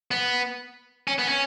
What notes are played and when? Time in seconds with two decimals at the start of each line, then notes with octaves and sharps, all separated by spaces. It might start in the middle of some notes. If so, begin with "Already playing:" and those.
0.11 B3
1.08 C#4
1.19 B3
1.29 C#4